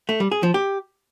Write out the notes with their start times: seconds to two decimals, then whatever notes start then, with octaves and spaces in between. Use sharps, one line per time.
0.09 A3
0.20 G3
0.32 G#4
0.43 F3
0.54 G4